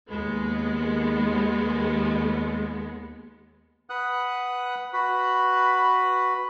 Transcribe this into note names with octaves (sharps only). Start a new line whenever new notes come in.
D#2 G#3 B3
B4 F#5 D#6 F#6
F#4 B4 B5